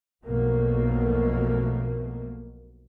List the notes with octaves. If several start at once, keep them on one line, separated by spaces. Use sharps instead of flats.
B1 F2 B2 A3 A#3